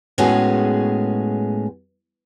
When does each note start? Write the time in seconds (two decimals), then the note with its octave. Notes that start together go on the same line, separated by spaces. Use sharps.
0.18 A2 G#3 B3 C#4 F#4 G#4